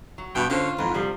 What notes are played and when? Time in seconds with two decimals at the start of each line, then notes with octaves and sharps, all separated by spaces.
0.18 F#3
0.35 G2 B2 G5
0.50 D3 C#4 F4 C5
0.78 F2 G#2 E3
0.94 C3 F3 G3